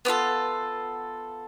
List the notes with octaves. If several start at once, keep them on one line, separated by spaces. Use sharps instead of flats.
B3 D4 F4 A4